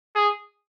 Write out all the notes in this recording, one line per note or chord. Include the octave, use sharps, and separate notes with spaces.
G#4